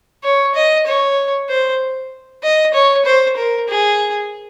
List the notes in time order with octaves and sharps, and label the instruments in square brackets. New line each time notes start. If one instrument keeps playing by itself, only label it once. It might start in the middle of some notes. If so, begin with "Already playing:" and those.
[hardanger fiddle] C#5
D#5
C#5
C5
D#5
C#5
C5
A#4
G#4